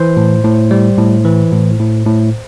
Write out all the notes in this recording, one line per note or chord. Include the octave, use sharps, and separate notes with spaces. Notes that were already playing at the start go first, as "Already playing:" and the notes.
Already playing: E3 C5
A2
A2
G3
A2
E3
A2
A2
A2